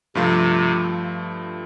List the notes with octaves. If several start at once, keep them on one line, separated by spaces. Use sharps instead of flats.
G2 C3 F3 A3 F4